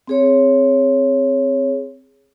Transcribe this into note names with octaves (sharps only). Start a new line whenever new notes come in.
C4 G#4 C#5